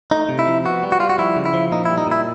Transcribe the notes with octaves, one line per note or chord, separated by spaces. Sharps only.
A3 D#4
C3
E4
F3
B3 F#4
G3
F#4
G3 F4
F#4
F3 E4
C#3
E4
F3
A#2 D#4
G3 E4
D#4
A#2 E4